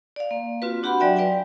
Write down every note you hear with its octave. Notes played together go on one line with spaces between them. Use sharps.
D5 F5
A#3
C4 F4 F#4 B4
D4 F#4 G4 F#5 B5 C6
F#3 F#4 D5 E5 G5 G#5
G4 B4 D5 F5 G5 G#5